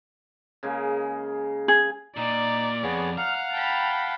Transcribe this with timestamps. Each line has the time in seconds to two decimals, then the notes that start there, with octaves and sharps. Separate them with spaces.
0.63 C#3 G#3 A#3
1.68 G#4
2.17 A#2 D#4 D5
2.83 F2 B3 G#4 C#5
3.18 F5 F#5 A#5 F6
3.53 G5 A5 B5